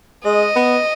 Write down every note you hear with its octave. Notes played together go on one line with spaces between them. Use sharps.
G#3 D#5
B3